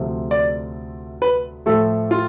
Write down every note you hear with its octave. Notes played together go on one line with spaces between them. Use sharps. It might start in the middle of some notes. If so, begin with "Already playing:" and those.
Already playing: D2 C3 F3 A3
D5
B4
A2 F3 A3 A4
F4